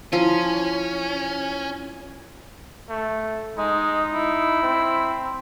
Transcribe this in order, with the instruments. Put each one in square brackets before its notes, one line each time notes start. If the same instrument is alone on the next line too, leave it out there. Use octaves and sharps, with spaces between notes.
[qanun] F3 [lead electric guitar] C#4 [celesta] E4 D#7
[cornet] A3
[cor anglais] G#3 [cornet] D#4
[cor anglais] E4
[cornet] C4